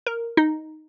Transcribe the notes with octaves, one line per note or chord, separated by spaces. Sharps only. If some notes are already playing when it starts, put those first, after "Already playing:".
A#4
D#4